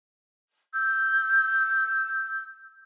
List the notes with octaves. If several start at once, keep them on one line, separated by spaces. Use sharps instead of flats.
E6 G6